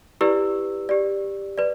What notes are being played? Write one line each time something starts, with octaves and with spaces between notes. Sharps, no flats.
E4 G4 B4 D5 E6
G4 D5
B4 D5